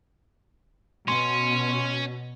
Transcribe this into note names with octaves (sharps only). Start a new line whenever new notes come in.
B2 C#4 C6